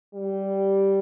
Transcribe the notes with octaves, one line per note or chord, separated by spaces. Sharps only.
G3